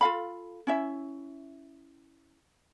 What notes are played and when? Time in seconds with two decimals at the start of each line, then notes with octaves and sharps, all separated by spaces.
0.01 F4 A4 F5 B5
0.67 C#4 E4 E5